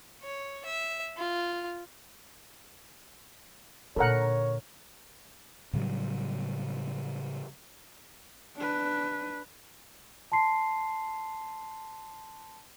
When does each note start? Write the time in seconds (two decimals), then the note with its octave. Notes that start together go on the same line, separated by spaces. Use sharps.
0.23 C#5
0.65 E5
1.18 F4
3.96 A#2 D3 A4 A#4 C#5 F#5
5.73 A2 C#3 F#3 G3
8.57 D4 B4
10.32 A5 C6 C7